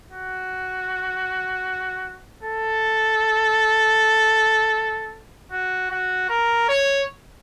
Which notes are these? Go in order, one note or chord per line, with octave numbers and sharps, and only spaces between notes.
F#4
A4
F#4
F#4
A#4
C#5